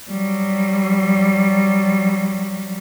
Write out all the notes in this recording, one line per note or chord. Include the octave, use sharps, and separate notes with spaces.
F#3 G3